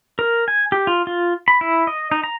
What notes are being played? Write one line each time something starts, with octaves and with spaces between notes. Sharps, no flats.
A#4
G#5
G4
F4
F4
B5
E4
D#5
D#4
A#5